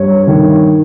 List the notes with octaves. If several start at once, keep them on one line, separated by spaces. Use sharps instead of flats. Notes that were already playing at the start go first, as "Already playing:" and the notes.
Already playing: G2 C#5
D#3